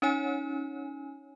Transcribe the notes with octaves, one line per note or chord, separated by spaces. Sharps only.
C#4 D#4 C#5 G#5